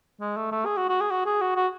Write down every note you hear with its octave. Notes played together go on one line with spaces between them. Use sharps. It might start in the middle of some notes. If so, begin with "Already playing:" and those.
G#3
A3
A3
G#4
F#4
F#4
G#4
F#4
G#4
F#4
F#4